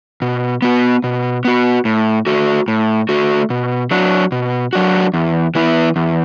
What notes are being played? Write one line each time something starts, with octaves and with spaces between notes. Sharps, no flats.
B2
B3 F#4
B2
B3 F#4
A2
A3 F#4
A2
A3 F#4
B2
F#3 D4 F#4
B2
F#3 D4 F#4
E2
E3 B3 E4
E2